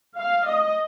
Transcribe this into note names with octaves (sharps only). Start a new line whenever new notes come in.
F5
D#5